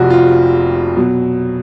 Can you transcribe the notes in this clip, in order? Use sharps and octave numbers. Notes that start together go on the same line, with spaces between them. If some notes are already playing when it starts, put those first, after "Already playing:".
Already playing: F1 F2 C3 F#4
F4
B2 F#3